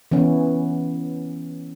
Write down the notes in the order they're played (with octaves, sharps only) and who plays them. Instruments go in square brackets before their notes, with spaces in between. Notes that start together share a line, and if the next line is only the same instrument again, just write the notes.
[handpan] E3 B3 C#4